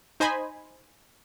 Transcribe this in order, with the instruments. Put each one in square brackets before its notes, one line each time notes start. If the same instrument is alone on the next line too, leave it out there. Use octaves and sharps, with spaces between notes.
[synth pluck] D#4 C5 D#5 G#5 B5